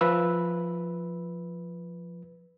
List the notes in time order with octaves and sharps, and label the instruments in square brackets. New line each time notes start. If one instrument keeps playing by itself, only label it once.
[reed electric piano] F3 B4 E6